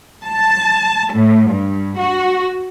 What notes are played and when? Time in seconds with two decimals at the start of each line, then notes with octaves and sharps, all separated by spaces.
0.24 A5
1.13 A2
1.49 G2
1.98 F#4